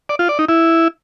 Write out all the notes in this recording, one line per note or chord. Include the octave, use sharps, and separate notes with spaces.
D5
F4
D5
D#4
E4